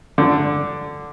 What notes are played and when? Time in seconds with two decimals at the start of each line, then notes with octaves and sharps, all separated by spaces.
0.18 D3